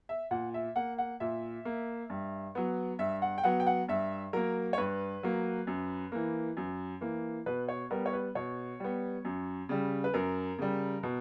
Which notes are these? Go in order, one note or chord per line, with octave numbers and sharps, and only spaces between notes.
E5
A#2 F#5
E5
A#3 F#5
F#5
A#2 E5
A#3
G2
F#3 B3
G2 E5
F#5
G5
F#3 B3 F#5
G5
F#5
G2 E5
F#3 A#3 A#4
C#5
G2 B4
F#3 A#3
F#2
E3 A#3
F#2
E3 A#3
B2 B4
C#5
G3 B3 A#4
C#5
B4
B2 C#5
G3 B3
F#2
C#3 G3
B4
F#2 A#4
C#3 G3
B2